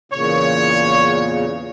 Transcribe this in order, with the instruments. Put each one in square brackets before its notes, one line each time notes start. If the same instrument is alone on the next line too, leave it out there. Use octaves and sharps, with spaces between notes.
[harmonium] E2 A#2 C#3 [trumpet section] C#5